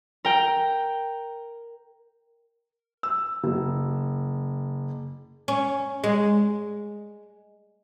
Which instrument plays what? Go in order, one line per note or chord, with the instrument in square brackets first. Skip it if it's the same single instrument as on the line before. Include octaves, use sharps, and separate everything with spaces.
[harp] A#4 G5
[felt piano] E6
F#1
[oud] C#4
G#3